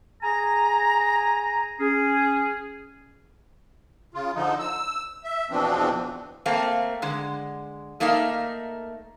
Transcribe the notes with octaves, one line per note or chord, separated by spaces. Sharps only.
G#4 G#5 A#5
C#4 G#4
C#3 F4
D3 F3 D#4
E6
E5
E2 B2 E3 F3 C4 D4
A3 A#3 C4 F5
D3 G#3
A3 A#3 D#4 E5 F5